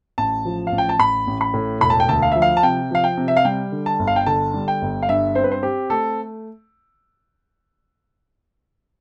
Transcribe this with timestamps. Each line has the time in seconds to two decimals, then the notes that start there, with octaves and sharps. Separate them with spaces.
0.18 A1 A5
0.45 F3
0.67 F5
0.72 A1
0.78 G5
0.89 A5
0.99 A1 B5
1.27 A1
1.41 B5
1.54 A2
1.81 E1 B5
1.90 A5
2.00 G5
2.08 D2 A5
2.22 F5
2.32 F3 E5
2.42 F5
2.57 A5
2.63 C3 G5
2.91 F3 F5
3.04 G5
3.17 C3
3.28 E5
3.37 F5
3.45 G3 G5
3.72 D3
3.86 A5
3.99 G1
4.07 F5
4.16 G5
4.26 D3 A5
4.54 G3
4.68 G5
4.82 G1
5.02 F5
5.09 G2 E5
5.35 C4 C5
5.44 B4
5.51 C5
5.63 C4 G4
5.90 A3 A4